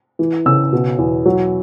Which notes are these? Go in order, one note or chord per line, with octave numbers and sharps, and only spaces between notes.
E3
C#3 E6
B2
E2
F#3